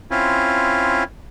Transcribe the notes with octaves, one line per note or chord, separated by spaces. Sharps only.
C4 C#4 E4 F4